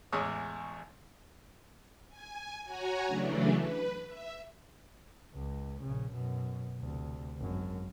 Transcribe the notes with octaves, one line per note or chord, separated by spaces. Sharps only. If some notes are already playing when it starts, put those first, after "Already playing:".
A1 E2 G#3 C#5 D#6
G#5
F#4 C#5 F#5 G#5 A#5
C#3 E3 F#3 A3 C#4 D4
B4
E5
C#2
A#1 C#3
F#2 B2
D2 C3
G#1 F#2